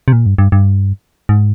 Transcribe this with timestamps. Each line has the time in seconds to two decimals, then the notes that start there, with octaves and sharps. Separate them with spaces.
0.08 C3
0.13 A#2
0.26 G2
0.38 G2
0.52 G2
1.29 G#2